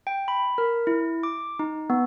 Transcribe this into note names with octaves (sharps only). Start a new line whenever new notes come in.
G5
B5
A#4
E4
D6
D#4
B3